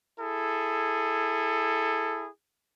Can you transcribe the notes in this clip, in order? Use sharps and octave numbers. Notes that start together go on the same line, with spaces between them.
E4 G#4 A4